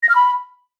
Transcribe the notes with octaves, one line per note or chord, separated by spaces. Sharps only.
A#6
F6
B5